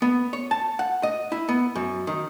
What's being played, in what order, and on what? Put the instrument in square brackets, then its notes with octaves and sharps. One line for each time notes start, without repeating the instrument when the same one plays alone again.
[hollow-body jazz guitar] B3
C#5
A5
F#5
D#5
E4
B3
F#2
D#3